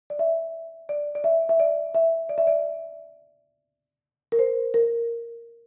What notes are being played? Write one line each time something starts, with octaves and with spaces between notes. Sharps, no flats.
D5
E5
D5
D5
E5
E5
D5
E5
D5
E5
D5
A#4
C5
A#4